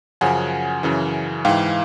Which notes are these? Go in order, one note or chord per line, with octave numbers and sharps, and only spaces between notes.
F#2 C#3 F3 F#5 G#5
F#2 C#3 E3
G#2 E3 F5 G5